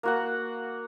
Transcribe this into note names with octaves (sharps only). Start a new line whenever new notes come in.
A#3 F#4 F#5